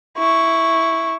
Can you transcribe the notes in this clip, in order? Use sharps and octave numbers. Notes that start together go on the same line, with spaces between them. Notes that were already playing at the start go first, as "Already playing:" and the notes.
E4 C#6